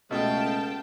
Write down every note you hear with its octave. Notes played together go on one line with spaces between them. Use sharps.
C#2 B2 A3 F5 G5 A5